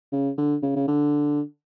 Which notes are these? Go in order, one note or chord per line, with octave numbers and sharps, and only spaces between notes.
C#3
D3
C#3
C#3
D3